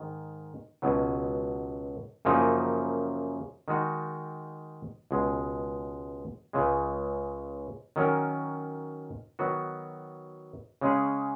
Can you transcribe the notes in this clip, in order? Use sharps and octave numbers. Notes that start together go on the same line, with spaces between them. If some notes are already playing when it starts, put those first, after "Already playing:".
Already playing: G#2 D#3
C#2 B2 F#3
F#2 C#3 F3 A#3 D#4
D#3 G#3 D#4 F#4
C#2 B2 G#3
C#2 C#3 G#3
D#3 F#3 C#4 F#4 A#4
D#3 F#3 B3 F#4
C#3 G#3 C#4 G#4